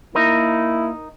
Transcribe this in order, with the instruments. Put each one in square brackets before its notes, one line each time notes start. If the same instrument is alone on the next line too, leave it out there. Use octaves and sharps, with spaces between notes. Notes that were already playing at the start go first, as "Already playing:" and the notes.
[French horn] A#3 [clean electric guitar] D#4 A#4 [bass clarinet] E4